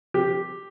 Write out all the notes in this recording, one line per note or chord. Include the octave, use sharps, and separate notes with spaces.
G4